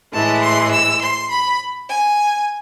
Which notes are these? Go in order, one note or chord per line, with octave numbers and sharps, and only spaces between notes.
A2 E3 G#3 A5
C6
E6
C6
B5
G#5